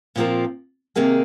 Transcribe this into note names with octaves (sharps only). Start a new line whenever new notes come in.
A#2 F3 C4 F4 A#4
C3 D#3 A#3 D#4 G#4